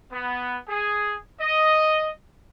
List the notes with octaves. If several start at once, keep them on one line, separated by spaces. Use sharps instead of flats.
B3
G#4
D#5